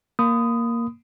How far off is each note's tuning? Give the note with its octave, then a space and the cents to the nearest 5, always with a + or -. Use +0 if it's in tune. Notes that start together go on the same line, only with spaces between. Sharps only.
A#3 +0 B5 +35 D#6 +0